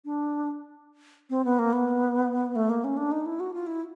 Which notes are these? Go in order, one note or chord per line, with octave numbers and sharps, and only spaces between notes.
D4
C4
B3
A#3
B3
A3
A#3
C#4
D4
D#4
E4
F#4
F4
E4